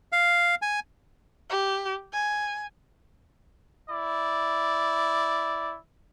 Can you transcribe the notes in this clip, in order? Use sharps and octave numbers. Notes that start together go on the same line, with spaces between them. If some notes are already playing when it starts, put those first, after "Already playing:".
F5
G#5
G4
G#5
E4 D5